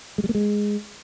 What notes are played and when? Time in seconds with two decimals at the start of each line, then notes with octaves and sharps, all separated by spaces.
0.18 G#3
0.24 G3
0.29 A#3
0.35 G#3